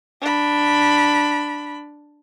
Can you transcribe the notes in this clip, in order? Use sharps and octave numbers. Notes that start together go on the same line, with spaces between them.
D4 B5